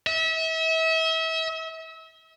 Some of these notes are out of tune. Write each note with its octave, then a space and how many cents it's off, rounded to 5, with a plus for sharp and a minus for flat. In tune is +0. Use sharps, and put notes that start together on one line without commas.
E5 -35